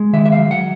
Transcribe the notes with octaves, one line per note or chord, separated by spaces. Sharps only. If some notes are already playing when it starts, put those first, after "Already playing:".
Already playing: G#3
D#3 E5
E5
F5
F#3
F#5